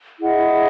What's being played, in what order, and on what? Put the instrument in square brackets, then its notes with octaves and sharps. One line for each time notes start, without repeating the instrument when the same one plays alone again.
[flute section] E4 G#4 D#5 F#5